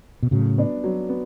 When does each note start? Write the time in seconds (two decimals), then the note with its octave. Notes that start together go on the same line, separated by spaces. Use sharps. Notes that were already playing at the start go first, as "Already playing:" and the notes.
0.23 B2
0.31 A2 C#3 F#3
0.58 B3 D4
0.84 F#3
1.09 B3